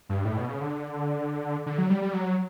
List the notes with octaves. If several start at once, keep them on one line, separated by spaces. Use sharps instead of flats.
G2
A2
B2
C#3
D3
D3
F#3
G3
G3
F#3